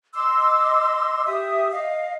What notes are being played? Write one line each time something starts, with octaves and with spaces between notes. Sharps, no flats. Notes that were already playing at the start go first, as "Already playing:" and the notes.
D#5 C6 D6 E6
G4 E5 D#6
D#5 F5